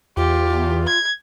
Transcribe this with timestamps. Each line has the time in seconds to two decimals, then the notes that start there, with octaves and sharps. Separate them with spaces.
0.17 E2 F4 G4
0.87 G#6